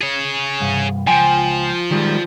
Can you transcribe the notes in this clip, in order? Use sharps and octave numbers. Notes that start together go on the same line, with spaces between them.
G#4 C#5
C2 G2
C#2 F3 G5 G#5
D#3 G3 G#3